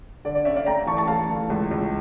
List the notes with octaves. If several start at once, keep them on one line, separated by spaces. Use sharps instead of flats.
D3 D5
D5
C#4 C#5 E5
D5 F5
A3 G5 A#5
E3 A5 C#6
A5 C#6
A3 F5 A5
E3
C#2
C#2